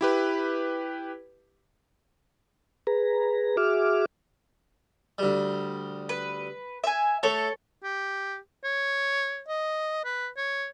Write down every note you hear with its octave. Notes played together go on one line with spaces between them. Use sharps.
E4 G4 B4
G#4 B4 A#5
F#4 G#4 E5 D6 F6
D2 G3
B4
E5 G#5
A3 A4 C#5
G4
C#5
D#5
B4
C#5